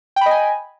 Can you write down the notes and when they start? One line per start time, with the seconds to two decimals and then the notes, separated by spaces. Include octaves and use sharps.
0.16 G5
0.21 B5
0.26 D#5
0.31 G#5